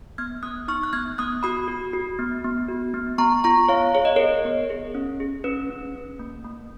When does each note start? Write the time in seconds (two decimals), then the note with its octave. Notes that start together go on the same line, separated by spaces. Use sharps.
0.18 B3 F6 G#6
0.43 B3 D#6 F#6
0.68 D#4 C#6 F6
0.83 F#6
0.93 B3 F6 G#6
1.18 B3 D#6 F#6
1.43 F#4 B5 D#6
1.68 F#4
1.93 F#4
2.19 B3
2.44 B3
2.69 F#4
2.94 B3
3.18 B3 A#5 C#6
3.44 F4 A#5 C#6
3.68 B3 C#5 F5
3.94 G#4 C#5
4.05 D#5
4.16 G#4 A#4 C#5
4.45 B3
4.70 G#4
4.95 C#4
5.20 G#4
5.44 C#4 B4
5.70 C#4
5.95 C#4
6.19 A#3
6.44 A#3